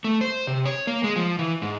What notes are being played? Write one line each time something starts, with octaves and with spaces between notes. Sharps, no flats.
A3
C5
C3
C#5
A#3
G#3
F3
E3
G#2